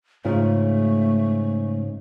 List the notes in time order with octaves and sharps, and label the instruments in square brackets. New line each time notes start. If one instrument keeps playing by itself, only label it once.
[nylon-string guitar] G#2 C#3 F4 [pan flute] A3